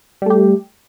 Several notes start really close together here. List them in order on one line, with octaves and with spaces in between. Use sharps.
G3 A3 G4